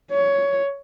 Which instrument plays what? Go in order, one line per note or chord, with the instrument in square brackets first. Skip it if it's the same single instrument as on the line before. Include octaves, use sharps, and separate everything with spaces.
[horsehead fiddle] C#5